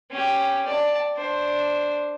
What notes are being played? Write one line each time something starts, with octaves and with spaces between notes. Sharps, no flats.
C#4 G4
D5 A5
D4 C5